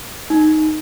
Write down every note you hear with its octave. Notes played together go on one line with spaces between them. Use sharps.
D#4